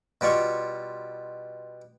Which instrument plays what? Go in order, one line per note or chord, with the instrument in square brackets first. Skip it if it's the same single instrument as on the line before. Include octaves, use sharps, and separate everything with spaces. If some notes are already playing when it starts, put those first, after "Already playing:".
[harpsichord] B2 G3 F4 C#6